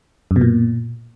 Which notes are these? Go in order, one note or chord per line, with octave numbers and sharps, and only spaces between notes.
F#2
B2
A#2